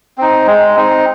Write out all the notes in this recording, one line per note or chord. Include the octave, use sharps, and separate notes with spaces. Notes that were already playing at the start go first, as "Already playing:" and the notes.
C4 D#4
G#3
C4 D#4